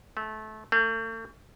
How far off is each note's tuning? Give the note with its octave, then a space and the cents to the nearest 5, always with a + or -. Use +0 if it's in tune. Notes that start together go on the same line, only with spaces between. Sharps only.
A3 -25
A3 +40